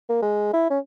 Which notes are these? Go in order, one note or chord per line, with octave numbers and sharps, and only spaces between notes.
A#3
G#3
E4
C#4